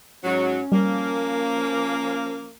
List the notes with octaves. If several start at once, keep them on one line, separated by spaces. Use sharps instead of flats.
G#2 F#3 C#4
F3 G3 A#3